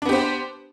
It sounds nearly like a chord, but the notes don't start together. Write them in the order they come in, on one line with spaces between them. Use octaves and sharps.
D4 B3 G4 C5